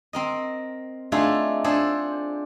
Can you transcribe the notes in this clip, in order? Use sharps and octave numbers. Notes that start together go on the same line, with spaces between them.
C4 A#4 D#5
A3 D4 D#4 F4 G#4 A4
D4 G#4 A4 C5